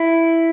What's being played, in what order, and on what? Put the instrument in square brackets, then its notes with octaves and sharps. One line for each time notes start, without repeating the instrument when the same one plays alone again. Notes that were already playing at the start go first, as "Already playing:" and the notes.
Already playing: [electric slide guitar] E4